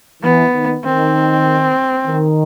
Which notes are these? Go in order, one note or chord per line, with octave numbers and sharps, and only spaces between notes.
E3 B3
D#3
D#3 C4
D#3